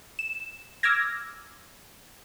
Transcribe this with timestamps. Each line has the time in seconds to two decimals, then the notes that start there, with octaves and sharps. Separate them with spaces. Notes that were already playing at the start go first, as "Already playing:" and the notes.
0.19 E7
0.83 D6 E6 F6 G#6 A#6